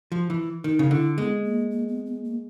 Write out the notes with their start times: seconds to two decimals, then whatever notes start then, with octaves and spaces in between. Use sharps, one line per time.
0.12 F3
0.30 E3
0.64 D#3 D#4
0.79 C#3
0.91 D3 E4
1.18 G#3 B3
1.44 A#3
1.71 A#3
1.88 B3
2.06 B3
2.24 A#3